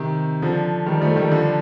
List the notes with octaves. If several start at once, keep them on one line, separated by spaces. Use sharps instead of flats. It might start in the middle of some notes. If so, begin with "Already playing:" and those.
Already playing: C3 D#3
D3 F3
D#3 G3
F3 A3
D#3 G3
D3 F3